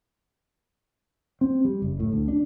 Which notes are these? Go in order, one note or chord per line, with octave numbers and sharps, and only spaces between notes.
C4
G3
F#1
A2
D2
D4